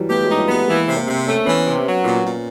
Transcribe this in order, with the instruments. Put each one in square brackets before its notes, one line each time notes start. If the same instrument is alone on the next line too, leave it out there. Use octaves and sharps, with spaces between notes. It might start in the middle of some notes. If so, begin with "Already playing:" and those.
Already playing: [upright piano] E3 F#3 G3
[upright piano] A3 B3 [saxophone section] G4
[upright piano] F#3 G#3
[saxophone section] D#4
[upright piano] F3 G3
[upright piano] G3 A3 [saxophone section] B3
[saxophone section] E3 [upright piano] G#3 A#3
[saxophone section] C3
[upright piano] A#3 C4
[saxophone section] C3
[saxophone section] A3 [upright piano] C#4
[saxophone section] E3 [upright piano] B3 C#4
[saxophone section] C3
F#3
A#2
A#2